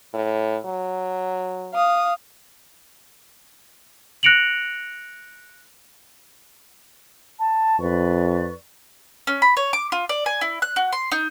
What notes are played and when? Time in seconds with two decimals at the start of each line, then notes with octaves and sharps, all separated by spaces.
0.14 A2
0.65 F#3
1.74 F5 D#6
4.23 F#6 A#6 C#7 D7 F7 F#7
7.39 A5
7.79 F2 B4 D5 C#6
9.27 C#4
9.42 B5
9.57 C#5
9.73 D6
9.92 F4
10.09 D5
10.26 G#5
10.41 E4
10.62 F#6
10.76 F#4
10.93 C6
11.12 D#4